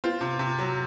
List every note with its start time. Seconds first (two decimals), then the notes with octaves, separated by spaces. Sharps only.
0.04 C4 F4
0.21 C3
0.39 C3
0.59 F#3